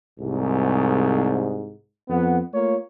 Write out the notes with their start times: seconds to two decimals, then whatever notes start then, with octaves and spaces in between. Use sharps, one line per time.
0.20 C2 G#2
2.09 F2 B3 F#5
2.54 A3 A#3 F4 C#5